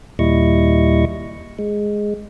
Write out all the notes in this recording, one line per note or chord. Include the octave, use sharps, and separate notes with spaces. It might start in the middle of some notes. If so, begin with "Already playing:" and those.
D#2 A#2 G3 E4 D#5 C#6
G#3